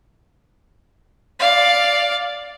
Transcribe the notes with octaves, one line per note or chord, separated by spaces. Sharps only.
D5 F5